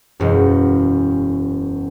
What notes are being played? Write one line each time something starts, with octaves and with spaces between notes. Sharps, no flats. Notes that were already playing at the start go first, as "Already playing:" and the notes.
E1 F#2